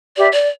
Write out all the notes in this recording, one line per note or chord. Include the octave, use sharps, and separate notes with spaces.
G4 B4 D5 E5
D5